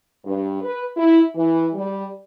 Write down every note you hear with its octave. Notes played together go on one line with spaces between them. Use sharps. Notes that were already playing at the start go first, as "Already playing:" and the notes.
G2
B4
E4
E3
G3